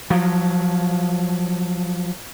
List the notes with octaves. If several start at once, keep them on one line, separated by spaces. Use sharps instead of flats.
F3 F#3